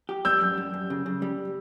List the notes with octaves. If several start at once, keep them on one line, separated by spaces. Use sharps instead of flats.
G4
G3 E6 G6
F#2
G3
F#2
C#3
C#3
G3